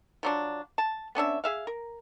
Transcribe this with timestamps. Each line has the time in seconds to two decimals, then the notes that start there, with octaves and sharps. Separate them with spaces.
0.23 F3 F#3 D4
0.78 A5
1.15 B3 C#4 D4 E5
1.44 G#4 E5 F5
1.67 A#4